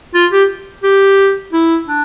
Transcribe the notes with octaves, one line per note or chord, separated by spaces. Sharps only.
F4
G4
G4
E4
D4